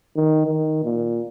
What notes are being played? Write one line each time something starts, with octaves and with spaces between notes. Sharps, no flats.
D#3
D#3
A#2